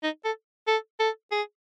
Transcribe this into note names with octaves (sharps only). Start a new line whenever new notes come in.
D#4
A4
A4
A4
G#4